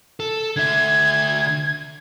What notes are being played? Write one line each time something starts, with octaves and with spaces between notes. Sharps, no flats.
A4
D3 E5 G#6